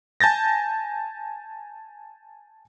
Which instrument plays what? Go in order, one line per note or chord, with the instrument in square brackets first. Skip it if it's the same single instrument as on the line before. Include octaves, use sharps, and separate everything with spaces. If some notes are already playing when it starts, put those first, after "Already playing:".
[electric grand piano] G#5 A5 G6 A6 A#6